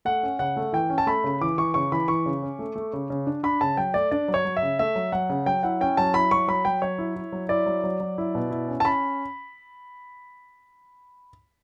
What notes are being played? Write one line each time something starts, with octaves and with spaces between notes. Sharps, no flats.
A3 F#5
C#4
C#3 F#5
A3
E3 G5
C#4
A5
A3 B5
C#3
E3 D6
E3 C#6
C#3 C#6
E3 B5
E3 C#6
C#3
C#4
A3
A3
C#3
C#3
D4
D4 B5
C#3 A5
F#3 G5
A3 D5
D4 D5
F#3
C#5
F#3
E5
C#3
A3 E5
F#3
F#3 F#5
C#3
F#3 G5
E4 F#5
C#4 G5
F#3 A5
E4 B5
F#3 C#6
F#3 B5
F#3 G5
F#3 C#5
E4
E4
F#3
E4 D5
F#3
F#3
F#3
E4
B2
E4
C#4
A5
C#4 B5